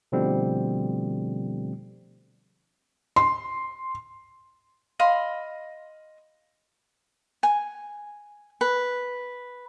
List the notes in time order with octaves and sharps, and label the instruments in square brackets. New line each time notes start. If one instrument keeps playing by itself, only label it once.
[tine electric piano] B2 D3 F3 G3 A3 C4
[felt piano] C6
[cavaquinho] D#5 F5 B5 C6
G#5
B4